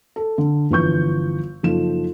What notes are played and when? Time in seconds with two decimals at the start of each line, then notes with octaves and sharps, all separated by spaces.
0.16 A4
0.38 D3
0.70 G1 E3 F3 C#6 G6
1.63 F#1 F3 D#4 A4 E7